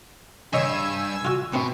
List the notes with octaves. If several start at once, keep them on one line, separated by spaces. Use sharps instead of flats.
G2 C#5 D#5 G#5 B5 E6
F4 F#4
B2 B3 C4 E4